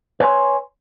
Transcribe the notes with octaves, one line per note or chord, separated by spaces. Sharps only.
B4 C#5 G#5 C6